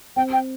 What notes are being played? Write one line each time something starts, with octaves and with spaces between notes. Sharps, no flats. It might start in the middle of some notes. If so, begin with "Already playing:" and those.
C4 G5
G5